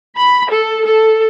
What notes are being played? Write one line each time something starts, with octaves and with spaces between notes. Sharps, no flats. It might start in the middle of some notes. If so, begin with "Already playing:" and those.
B5
A4
A4